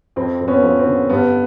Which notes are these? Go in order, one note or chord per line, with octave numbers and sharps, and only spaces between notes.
F2 C4
F2
B3 C#4
F3
C4
D3
G2 B3